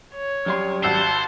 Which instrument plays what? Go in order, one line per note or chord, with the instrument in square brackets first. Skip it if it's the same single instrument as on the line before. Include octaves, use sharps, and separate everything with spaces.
[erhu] C#5
[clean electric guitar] F#2 G3 C6
[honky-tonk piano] G#1 F#4 E6 [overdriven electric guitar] C5 [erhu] A5